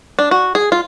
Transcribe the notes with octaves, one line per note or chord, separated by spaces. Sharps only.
D4
F#4
G#4
F4